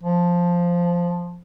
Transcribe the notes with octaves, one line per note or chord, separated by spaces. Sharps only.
F3